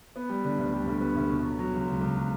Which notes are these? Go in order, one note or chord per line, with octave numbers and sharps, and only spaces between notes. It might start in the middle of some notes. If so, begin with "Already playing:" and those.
B3
G3
D3
D2
G3
D2
B3
D2
B2
F#3
F#3
C#2
C#2
C#2
F#3